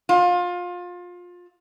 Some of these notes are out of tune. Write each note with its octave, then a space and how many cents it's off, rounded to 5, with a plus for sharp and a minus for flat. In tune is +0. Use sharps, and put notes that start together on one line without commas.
F4 +25